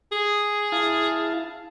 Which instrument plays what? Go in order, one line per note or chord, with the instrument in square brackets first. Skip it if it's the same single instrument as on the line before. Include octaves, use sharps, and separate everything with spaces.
[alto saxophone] G#4
[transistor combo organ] E4 F5 A5